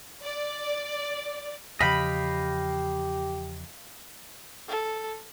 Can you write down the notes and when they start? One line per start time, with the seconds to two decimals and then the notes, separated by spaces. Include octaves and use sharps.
0.23 D5
1.81 E2 C#3 F3 G4 D#5 F5 G5 B5
4.68 A4